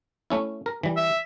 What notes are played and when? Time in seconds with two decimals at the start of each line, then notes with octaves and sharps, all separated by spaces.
0.30 A3 C#4 E4
0.66 A#4
0.83 E3 G3
0.97 E5